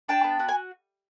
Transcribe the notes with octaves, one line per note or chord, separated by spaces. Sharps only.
D4 G5 A5
B3
F#4
G#5